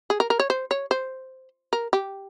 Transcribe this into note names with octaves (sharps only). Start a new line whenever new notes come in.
G#4
A#4
A#4
C#5
C5
C#5
C5
A#4
G4